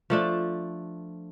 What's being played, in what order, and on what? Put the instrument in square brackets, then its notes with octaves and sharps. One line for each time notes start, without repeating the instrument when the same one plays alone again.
[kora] F3 A3 D4